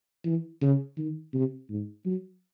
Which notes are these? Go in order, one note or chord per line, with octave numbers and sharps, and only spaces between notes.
E3
C#3
D#3
C3
G#2
F#3